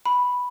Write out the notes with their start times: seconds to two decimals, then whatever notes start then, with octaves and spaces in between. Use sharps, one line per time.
0.06 B5